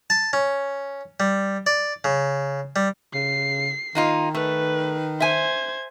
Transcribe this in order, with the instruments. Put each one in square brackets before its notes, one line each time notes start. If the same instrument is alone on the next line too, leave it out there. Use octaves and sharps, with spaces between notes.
[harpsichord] A5
C#4
G3
D5
C#3
G3
[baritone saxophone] C#3 [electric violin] C7
[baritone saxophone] D#3 [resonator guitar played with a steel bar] A#3 D#4 F4
[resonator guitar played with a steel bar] A3 [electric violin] B4
[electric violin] C5 G#6 [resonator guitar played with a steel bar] E5 G#5